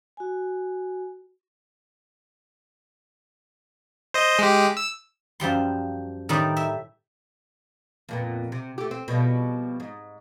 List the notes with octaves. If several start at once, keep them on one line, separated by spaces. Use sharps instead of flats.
F#4 G#5
C5 D#5
G#3 G4
E6
F#2 F3 G3 C6
A2 D#3 G3 D4 D#4 D5
E5
F2 A#2 B3
C3
A3 G4
C4
B2 F3 G3
G#2